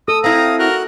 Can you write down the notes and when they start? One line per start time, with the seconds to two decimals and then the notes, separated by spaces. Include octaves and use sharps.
0.08 A4 D#6 E6
0.24 C4 E4 F5 A#5 D#6
0.59 F#4 A#4 F#6